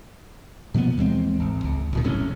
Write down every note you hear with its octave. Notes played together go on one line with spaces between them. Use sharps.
B2 F3 A#3 B3
D#2 E3 G#3 C4
G#1
C#2
D1 B2 D#3
F#1 C2 A2 C#4